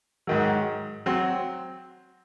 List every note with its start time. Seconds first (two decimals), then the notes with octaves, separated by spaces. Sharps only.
0.27 G#2 D#3 F#3
1.06 F#3 C4